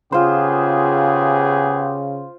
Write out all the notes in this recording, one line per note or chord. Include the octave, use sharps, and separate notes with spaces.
C#3 B3 F4 G4 G#4 C5